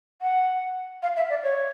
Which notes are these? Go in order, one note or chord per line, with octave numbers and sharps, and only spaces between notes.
F#5
F5
E5
D5
C#5